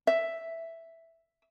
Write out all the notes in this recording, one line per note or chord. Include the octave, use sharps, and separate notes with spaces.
E5